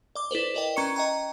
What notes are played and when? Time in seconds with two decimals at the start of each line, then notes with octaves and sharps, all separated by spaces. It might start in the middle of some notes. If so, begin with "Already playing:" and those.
0.15 D5 D6
0.31 E4 A4 B4 C5
0.54 A#4 B4 D5 D#5 G5
0.76 C#4 A#5 C#6 C#7
0.96 D#5 G5 A#5